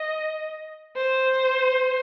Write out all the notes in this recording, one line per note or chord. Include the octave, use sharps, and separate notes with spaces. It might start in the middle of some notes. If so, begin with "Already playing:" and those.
Already playing: D#5
C5